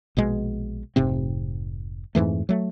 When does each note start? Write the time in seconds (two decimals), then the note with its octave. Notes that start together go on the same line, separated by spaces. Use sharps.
0.17 A#1 B2 G#3
0.96 F1 G#2 C3 C4
2.15 F2 G#2 E3 A3
2.49 F#3 A3